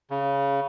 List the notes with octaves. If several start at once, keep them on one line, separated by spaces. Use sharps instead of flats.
C#3